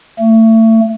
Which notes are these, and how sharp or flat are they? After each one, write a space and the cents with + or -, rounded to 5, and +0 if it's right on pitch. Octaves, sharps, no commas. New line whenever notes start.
A3 +30